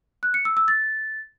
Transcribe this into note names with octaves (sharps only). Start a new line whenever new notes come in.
F#6
C#7
E6
E6
A6